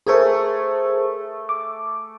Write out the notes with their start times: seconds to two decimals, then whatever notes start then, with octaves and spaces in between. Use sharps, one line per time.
0.07 A3 G#4 A#4 C5 G#5 D#6
1.49 D6